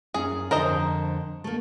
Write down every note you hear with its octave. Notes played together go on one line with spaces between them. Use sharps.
F#2 C#4 G#4
F2 D3 A#4 C5 D#5
A3 A#3